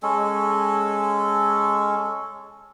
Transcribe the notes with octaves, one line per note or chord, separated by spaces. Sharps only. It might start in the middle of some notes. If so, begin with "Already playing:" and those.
G#3 C#4 A4